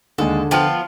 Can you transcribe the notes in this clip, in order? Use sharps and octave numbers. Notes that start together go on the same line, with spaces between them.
D#2 D3 G#3 G#4 A4
F3 B3 F4 G5 A5 F6